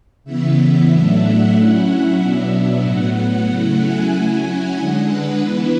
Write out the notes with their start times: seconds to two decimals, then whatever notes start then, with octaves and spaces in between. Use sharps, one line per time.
0.24 C#3 E3 B3 E5
0.89 A2 F#3 A3 D4
1.21 F#5
1.54 F#3 C#4 E4 F#5
1.86 E5
2.18 B2 F#3 B3 D4
2.82 A2 F#3 B3 F#5
3.15 F#5
3.47 C#3 F#3 A3 E4
3.79 G#5
4.12 F#3 C#4 E4
4.44 F#5
4.76 D3 G#3 D4
5.08 B4
5.41 E3 B3 E4